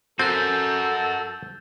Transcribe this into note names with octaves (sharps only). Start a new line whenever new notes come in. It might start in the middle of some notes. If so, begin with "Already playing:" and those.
C4 F#4 A4 A#4 F#6 G6 A6